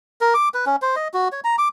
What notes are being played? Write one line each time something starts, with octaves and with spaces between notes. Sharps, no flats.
A#4
D6
B4
C#4
C5
D#5
F#4
C#5
A#5
D6